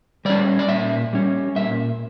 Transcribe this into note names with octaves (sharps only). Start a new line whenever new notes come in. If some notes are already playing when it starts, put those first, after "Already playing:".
G3 C#4 D5
D5
A#2 E5
G3 C#4
A#2 E5